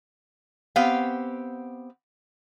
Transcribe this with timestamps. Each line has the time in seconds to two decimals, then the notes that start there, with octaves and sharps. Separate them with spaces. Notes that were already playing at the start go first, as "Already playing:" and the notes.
0.76 B3 C4 G4 F5